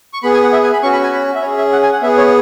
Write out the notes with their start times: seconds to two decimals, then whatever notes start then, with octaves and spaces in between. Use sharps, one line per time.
0.13 C#6
0.23 B3 G#4 B5
0.33 G#5
0.43 F#5
0.53 E5
0.63 G#5
0.73 B5
0.83 C#4 F#4 C#6
0.93 B5
1.03 G#5
1.13 B5
1.35 E5
1.42 C#4 G#4 C#5
1.57 E5
1.72 F#5
1.83 G#5
1.93 F#5
2.02 B3 E5
2.06 G#4
2.18 C#5